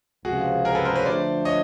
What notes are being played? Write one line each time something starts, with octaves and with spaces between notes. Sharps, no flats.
C#2 C3 F3 F#4 G#4
G#4 A#4
A4 B4
A#4 C5
B4 C#5
D3 F3 A3 C5 D5
C#5 D#5